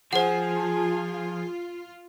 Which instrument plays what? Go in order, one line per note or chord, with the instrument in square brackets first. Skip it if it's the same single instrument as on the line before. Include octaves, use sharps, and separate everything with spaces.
[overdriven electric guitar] F3 [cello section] F4 [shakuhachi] G#4 [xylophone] C5 F#5